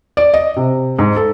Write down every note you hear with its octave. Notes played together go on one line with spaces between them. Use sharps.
D5
D#5
C3
G#2
A4